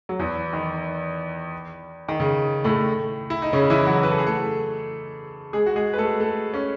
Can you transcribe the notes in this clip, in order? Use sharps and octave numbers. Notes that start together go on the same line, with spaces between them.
F#3
E2 E3
D#3
D#3
C#3
A2 A3
E4
D#4
C#3 C#4
E3 E4
F#3 F#4
B4
A4
G#4
A3 A4
G#3 G#4
F#4
G#3 G#4
B4
A3 A4
A3 A4
C#4